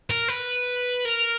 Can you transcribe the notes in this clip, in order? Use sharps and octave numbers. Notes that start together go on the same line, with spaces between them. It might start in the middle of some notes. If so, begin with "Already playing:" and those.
A#4
B4
A#4